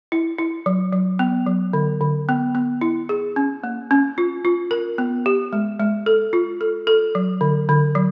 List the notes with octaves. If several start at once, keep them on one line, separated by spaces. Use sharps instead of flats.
E4
E4
F#3
F#3
B3
F#3
D3
D3
B3
B3
E4
G#4
C#4
A#3
C#4
F4
F4
A#4
B3
G4
G#3
G#3
A4
F4
A4
A4
F#3
D3
D3
F#3